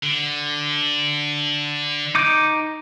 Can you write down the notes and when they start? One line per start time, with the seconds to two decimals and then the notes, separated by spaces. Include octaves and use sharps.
0.03 D3
2.15 D#4 D6 G6